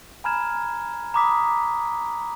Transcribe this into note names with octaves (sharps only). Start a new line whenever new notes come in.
G#5 A#5 B5 F6 G#6 E7
A#5 B5 D6 D#6 B6